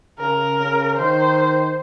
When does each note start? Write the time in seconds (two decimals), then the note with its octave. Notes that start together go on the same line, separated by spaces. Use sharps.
0.19 C#3 A#4
0.59 C#3
0.98 D#3 C5